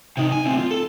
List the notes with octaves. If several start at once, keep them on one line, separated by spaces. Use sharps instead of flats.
C3 D#4
G#5
D2 C4
F4
A4